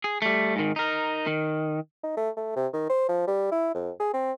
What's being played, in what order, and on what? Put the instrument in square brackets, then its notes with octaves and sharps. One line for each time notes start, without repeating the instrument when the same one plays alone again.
[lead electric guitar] G#4
G3 A3
G#2 D#3
D#4 A#4
D#3
[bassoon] D#4
A3
A3
C3
D#3
C5
F3
G3
E4
F2
G#4
C4